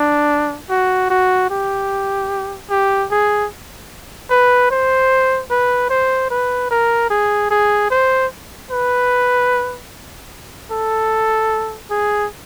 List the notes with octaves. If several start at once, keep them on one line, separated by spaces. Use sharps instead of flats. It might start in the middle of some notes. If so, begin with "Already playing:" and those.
Already playing: D4
F#4
F#4
G4
G4
G#4
B4
C5
B4
C5
B4
A#4
G#4
G#4
C5
B4
A4
G#4